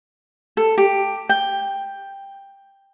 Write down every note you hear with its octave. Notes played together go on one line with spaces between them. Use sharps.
A4
G4
G5